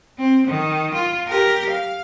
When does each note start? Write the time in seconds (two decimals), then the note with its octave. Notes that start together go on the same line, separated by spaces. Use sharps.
0.18 C4
0.47 D#3
0.94 F4
1.28 G4 A#4
1.69 F5